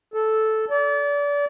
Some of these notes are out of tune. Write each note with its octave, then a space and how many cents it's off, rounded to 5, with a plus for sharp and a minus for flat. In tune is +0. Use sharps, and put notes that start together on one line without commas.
A4 -5
D5 -30